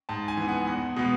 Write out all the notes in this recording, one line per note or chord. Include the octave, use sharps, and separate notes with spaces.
G#2 A5
G#5
E3 B3
F#5
E2 F#5
B2 G#3 B3